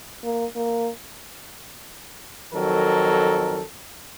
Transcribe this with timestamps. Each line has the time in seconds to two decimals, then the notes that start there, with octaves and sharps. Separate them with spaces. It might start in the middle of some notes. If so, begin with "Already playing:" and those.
0.24 A#3
0.56 A#3
2.53 F2 D#3 F#3 A4 A#4